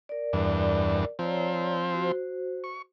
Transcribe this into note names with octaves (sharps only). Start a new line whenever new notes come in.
A#4 D5
E2 G2 D4
F3 C4 C#5 D5 A#5
F#4 C5
C#6